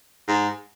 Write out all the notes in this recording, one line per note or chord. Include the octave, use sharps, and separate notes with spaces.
G#2